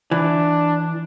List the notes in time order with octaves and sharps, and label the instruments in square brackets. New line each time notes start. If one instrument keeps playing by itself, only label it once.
[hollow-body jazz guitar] E3 [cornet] D4